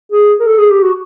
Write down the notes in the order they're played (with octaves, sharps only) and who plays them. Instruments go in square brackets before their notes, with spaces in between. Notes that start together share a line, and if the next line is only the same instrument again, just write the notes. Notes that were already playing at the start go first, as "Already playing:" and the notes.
[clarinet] G#4
A#4
A4
G#4
G4
F#4